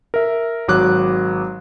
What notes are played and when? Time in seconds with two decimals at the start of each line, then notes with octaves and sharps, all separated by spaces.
0.14 A#4 E5
0.68 G#1 F#3 D6 F#6